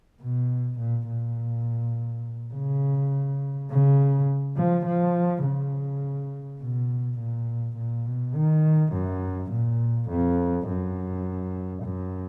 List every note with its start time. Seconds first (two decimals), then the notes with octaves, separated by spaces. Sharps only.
0.22 B2
0.79 A#2
1.08 A#2
2.53 C#3
3.70 C#3
4.56 F3
4.85 F3
5.44 C#3
6.61 B2
7.19 A#2
7.77 A#2
8.06 B2
8.35 D#3
8.93 F#2
9.51 A#2
10.10 F2
10.68 F#2
11.83 F#2